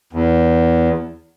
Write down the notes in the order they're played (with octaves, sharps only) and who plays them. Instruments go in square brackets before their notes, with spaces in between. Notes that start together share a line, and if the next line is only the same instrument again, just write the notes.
[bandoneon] E2